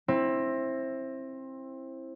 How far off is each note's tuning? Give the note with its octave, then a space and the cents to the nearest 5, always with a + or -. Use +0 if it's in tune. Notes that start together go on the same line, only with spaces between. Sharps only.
C4 +20 E4 +0